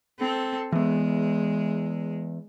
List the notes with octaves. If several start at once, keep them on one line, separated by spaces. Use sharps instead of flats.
C4 A4
E3 G#3 B3